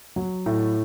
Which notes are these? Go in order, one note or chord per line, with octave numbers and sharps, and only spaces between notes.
F#3
A2